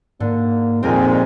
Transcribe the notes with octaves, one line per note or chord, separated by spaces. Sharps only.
G#2 D3 A#3
F2 A#2 D#3 G#3 C4 A#4 G#5